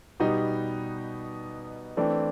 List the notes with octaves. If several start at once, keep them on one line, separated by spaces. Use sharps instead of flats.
B2 G3 B3 D#4
E3 A3 C4 D4